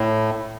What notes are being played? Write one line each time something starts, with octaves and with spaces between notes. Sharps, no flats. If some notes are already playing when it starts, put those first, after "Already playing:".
Already playing: A2